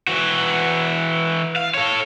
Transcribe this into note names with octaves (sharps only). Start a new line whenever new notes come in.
E3 F#4
F5
A4 C#5